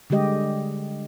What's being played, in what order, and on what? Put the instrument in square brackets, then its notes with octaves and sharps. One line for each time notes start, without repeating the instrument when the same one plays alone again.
[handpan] D3 G3 G#3 G4 D#5